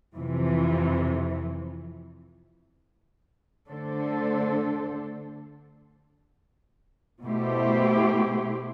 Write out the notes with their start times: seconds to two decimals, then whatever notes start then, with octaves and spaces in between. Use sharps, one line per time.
0.16 F2 C3 E3
3.70 D3 A3 D4 A4 C5
7.23 B2 A3 E4 G4 C5